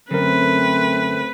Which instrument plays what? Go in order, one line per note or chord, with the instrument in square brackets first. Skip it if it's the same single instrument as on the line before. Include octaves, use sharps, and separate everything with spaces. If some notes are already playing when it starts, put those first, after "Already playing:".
[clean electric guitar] F#2 [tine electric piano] D3 A#4 [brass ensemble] A3 C4 [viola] B4